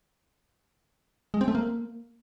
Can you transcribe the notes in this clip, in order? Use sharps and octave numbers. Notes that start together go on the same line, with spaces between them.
G#3
C4
A3
A#3